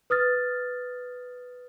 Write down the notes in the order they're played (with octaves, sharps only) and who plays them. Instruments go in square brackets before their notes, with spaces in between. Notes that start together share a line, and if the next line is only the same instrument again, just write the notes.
[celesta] B4 D#6 F6 A6